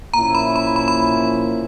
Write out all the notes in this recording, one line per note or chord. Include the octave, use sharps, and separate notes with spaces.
A#2 F3 A#3 C#4 E4 A#5
B5
B5
B5
B5